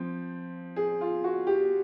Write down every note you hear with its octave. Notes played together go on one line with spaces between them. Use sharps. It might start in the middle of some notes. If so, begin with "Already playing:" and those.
Already playing: F3 C4
G#4
F4
F#4
G4